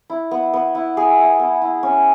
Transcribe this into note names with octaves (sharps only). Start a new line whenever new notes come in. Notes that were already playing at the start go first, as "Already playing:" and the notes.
E4
B3
B3
E4
G#4
E4
B3
E4
C#4